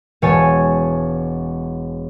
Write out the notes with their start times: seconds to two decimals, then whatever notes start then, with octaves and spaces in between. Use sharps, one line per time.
0.22 E1 C#5 G#5 A5